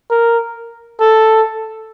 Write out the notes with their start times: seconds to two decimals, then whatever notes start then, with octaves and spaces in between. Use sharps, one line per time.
0.10 A#4
1.00 A4